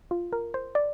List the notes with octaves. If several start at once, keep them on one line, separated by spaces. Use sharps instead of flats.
F4
A#4
C5
D5